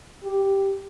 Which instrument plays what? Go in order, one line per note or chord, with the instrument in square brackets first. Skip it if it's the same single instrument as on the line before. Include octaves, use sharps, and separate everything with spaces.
[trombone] G4